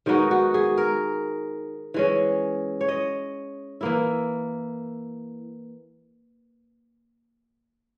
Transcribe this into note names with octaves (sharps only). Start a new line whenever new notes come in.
D#3 G#3 B3 D#4 F#4
F#4
G#4
A#4
E3 G#3 C#4
C#5
D#5
E3 A#3 E4